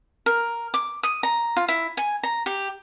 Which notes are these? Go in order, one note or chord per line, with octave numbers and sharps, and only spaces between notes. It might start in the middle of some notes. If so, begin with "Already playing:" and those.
A#4
D6
D#6
A#5
F4
E4
G#5
A#5
G4